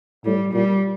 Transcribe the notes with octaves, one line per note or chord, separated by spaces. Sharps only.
A2 G3
A#2 G3